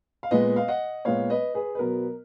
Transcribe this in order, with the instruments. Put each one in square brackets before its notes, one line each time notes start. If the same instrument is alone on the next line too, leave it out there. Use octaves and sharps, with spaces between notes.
[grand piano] F5
A#2 G#3 B3 B4 D#5
F5
D#5 F#5
A#2 G#3 B3 C#5 F5
B4 D#5
G#4 B4
B4
B2 F#3 B3 A#4